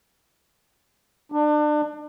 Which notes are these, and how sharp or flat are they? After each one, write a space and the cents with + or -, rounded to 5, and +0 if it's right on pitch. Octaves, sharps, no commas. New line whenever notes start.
D4 +30